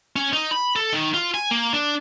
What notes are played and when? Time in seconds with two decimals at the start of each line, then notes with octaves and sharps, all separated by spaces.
0.16 C#4
0.33 D#4
0.51 B5
0.76 A4
0.92 D#3
1.14 F4
1.34 G#5
1.51 A#3
1.73 D4